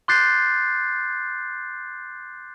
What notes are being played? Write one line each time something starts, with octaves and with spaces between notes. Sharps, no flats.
C6 D6 F#6 G6 A6 C7